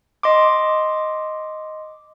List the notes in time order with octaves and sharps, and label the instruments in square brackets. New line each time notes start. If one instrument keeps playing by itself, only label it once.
[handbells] D#5 C6 D6